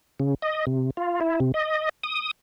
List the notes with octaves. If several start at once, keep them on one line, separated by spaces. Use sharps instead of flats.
C#3
D#5
C3
F4
E4
C3
D#5
D#6